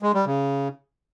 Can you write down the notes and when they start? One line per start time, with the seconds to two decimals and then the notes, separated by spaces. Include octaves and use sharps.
0.02 G#3
0.14 G3
0.26 C#3